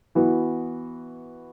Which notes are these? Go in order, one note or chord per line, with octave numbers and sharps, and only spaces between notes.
E3 B3 F#4